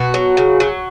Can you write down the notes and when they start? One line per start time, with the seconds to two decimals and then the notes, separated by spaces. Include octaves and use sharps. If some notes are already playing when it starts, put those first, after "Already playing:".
Already playing: B2 F#4
0.14 F#3
0.37 C#3
0.60 F#3